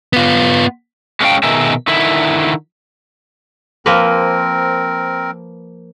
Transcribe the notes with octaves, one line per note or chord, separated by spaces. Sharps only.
B3 F4
G#3 A#3 C#4 D4 F5 G5
B2 D#3 G#4 A#4 E5
D3 D#3 E4
F3 A#3 C4 A#4 B4